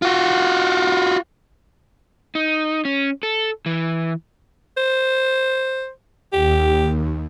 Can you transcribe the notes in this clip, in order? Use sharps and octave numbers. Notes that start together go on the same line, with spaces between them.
F4 F#4
D#4
C#4
A4
E3
C5
D#2 G4